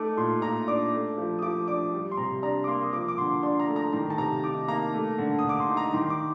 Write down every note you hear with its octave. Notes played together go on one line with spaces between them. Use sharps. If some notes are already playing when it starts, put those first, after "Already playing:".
Already playing: A3 D#4 D6
A#2 C6
A#2 A#5
D4 D6
A3
F3
D#6
F3 D6
D4 D6
G3
C6
C3 A#5
D4 A#5
D6
A#3 C6
D#6
F3 D6
D6
D3 C6
D4 C6
A#5
A3
A#5
D#3 A#5
A5
C3 A#5
D#4 D6
A#3 A#5
A3
D3
D3 D#6
D6
C6
D#4
A#5
D#3 C6
D6